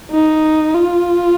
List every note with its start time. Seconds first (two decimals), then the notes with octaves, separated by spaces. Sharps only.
0.11 D#4
0.74 F4